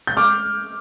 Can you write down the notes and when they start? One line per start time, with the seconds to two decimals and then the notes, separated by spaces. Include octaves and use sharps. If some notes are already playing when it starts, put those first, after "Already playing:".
0.07 G6
0.17 D6 F6